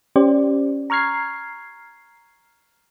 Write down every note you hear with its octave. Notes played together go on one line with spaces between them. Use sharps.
C#4 G4 C5 D5
A#5 C#6 F6 G#6 C7